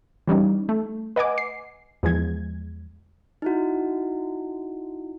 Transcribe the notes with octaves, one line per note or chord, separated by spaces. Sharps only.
E3 G3 C#4 D#4
A3
B4 D#5 F#5 G#5 D6
C7
E2 F3 G#3 G#6
D#4 E4 F#4